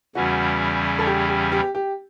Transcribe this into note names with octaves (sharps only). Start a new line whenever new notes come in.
E2 C#3 E3 G3 C#4 F#4
A4
G4
G4
G4
G4